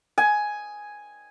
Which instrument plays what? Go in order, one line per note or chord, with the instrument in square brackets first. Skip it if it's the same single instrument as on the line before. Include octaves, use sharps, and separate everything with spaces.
[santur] G#5